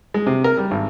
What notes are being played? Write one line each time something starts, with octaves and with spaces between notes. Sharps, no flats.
G#3
C3
A#4
G3
G#1